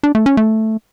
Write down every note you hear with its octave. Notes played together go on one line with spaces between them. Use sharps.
D4
A3
C#4
A3